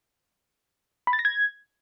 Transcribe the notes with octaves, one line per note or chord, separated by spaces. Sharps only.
B5
A6
A#6
G#6